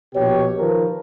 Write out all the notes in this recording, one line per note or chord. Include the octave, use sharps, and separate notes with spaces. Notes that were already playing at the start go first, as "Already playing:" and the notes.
A#1 B2 G4 C#5
D#3 F3 A#4 B4